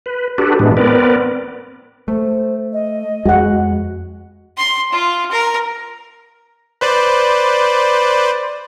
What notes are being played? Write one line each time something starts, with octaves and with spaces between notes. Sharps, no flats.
B4
D4 F#4 G4 A4 B4
A2 E3 G#3 B3 D4
B3 C4 A#4 B4 D5
A3 C5
D#5
F2 G#3 F#4 F#5
C6
F4
A#4
B4 C5 D5